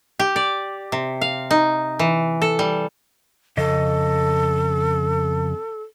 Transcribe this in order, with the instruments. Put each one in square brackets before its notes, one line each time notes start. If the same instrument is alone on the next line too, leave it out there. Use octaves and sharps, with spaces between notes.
[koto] G4
D5
C3
F5
D#4
E3
A4
G3
[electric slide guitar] F2 C#3 D#5 [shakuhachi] A4